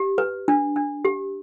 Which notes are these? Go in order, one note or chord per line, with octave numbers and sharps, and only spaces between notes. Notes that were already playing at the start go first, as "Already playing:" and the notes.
Already playing: G4
B4
D4
D4
G4